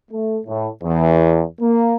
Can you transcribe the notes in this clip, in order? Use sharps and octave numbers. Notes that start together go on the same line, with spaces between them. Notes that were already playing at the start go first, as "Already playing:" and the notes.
A3
A2
E2
A#3